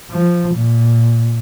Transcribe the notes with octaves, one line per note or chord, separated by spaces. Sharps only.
F3
A#2